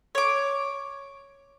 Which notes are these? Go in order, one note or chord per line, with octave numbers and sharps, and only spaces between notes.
C#5 D6